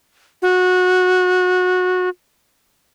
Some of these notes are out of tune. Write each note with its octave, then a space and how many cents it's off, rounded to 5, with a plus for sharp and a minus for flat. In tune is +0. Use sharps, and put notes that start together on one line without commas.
F#4 -20